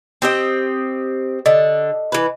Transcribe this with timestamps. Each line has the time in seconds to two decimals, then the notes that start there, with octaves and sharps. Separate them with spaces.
0.22 C4 G4 D#5
1.46 D3 D#5
2.12 E3 B4